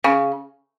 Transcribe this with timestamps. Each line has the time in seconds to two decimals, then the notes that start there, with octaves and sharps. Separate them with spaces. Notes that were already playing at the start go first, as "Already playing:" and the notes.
0.04 C#3